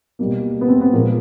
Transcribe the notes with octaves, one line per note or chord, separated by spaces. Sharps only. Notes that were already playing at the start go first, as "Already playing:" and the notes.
B2 G3 A#3
B3
C4
B3
A#2 F3 G#3 A#3